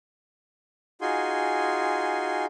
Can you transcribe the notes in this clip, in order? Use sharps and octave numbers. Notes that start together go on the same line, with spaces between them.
D#4 F4 F#4 G#4 G#5 C6